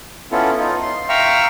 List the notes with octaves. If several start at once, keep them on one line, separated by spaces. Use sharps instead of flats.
B3 C#4 E4 F4 A4
D#4 F4
C6
E5 F5 G5 A#5 C#6 E6